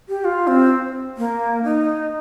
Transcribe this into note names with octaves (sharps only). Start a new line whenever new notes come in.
G4
F4
C4
A#3
D#4